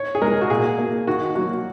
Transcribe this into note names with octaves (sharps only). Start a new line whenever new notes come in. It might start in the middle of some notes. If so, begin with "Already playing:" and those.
Already playing: C#5
G#4
G#3 A#4
F#4
A#2 G#4
A#3
D#3 F#4
F#3 A#3 F#4